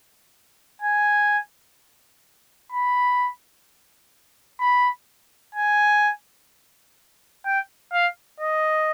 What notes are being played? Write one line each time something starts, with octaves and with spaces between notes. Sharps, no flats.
G#5
B5
B5
G#5
G5
F5
D#5